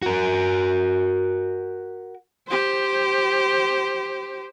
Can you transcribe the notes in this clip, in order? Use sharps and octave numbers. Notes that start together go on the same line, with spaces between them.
F#4 A#4
G4 C5